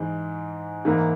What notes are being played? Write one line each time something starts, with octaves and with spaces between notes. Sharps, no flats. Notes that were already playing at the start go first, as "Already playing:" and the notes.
Already playing: G#2 E3 G#3
G#2 E3 A#3 E4